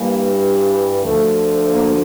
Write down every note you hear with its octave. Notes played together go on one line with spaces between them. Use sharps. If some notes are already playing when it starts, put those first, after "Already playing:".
Already playing: G2 E3 G3 A#3
D2 D3 F3 A3
A#3